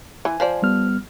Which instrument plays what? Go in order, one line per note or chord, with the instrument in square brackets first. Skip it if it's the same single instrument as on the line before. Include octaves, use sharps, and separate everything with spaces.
[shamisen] E3 [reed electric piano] G#5
[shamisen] F3 C5 D5
[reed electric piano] G3 B3 F6